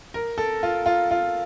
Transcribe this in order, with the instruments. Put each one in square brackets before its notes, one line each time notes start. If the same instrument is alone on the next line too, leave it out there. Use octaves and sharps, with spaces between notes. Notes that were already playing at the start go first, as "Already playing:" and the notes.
[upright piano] A#4
A4
F4
F4
F4